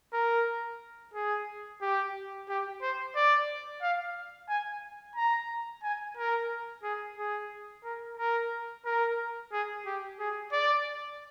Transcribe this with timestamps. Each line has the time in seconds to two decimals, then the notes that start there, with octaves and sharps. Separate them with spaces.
0.13 A#4
1.14 G#4
1.82 G4
2.49 G4
2.82 C5
3.15 D5
3.82 F5
4.49 G#5
5.16 A#5
5.83 G#5
6.17 A#4
6.83 G#4
7.18 G#4
7.84 A#4
8.17 A#4
8.85 A#4
9.53 G#4
9.86 G4
10.20 G#4
10.52 D5